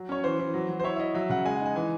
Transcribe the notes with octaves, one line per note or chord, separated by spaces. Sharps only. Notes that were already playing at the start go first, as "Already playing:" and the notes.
Already playing: F#3
C#4 C#5
E3 C5
E3
F#3
F#3
C5
E4 C#5
E5
E4 D#5
F#3 E5
C#3 F#5
G#3 G#5
F#5
D#4 G#5
E3 G#5